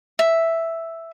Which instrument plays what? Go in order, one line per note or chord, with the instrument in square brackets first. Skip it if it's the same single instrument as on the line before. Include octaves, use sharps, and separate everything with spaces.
[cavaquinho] E5